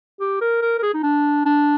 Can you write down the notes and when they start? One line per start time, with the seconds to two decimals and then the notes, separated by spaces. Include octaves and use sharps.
0.20 G4
0.41 A#4
0.62 A#4
0.78 A#4
0.83 G#4
0.94 D#4
1.03 D4
1.46 D4